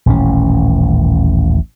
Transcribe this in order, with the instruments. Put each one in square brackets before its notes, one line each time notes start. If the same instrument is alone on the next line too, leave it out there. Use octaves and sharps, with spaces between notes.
[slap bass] D#1 A1 C#4